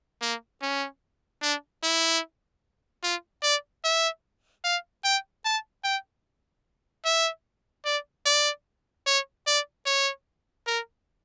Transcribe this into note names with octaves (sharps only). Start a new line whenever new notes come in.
A#3
C#4
D4
E4
F4
D5
E5
F5
G5
A5
G5
E5
D5
D5
C#5
D5
C#5
A#4